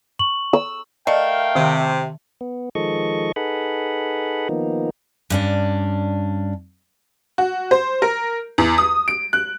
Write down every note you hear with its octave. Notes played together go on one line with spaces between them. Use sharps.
C#6 F#7
E6
A3 A#4 D5 D#5 F5 G5
C3 D#3
B3
D#3 F3 G#3 A4 D#5 C#6
D#4 G#4 A4 B4 F#5 B5
D#3 F3 A#3 B3 D#4
G2 C#4 D4
F#4
C5
A#4
E2
D#6
D7
F#6